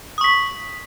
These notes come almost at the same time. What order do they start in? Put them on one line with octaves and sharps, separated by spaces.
D#6 C#6 B6